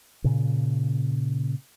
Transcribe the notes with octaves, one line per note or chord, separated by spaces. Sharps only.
A#2 C#3